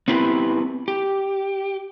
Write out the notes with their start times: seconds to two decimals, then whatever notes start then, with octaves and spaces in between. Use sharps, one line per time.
0.08 B3 C4 E4 G4 B4
0.88 G4